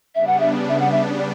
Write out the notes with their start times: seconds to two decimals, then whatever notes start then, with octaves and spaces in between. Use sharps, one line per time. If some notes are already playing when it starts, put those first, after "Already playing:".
0.15 C#3 G3 B3 D4 E5
0.27 F#5
0.40 E5
0.69 E5
0.80 F#5
0.92 E5
1.18 D5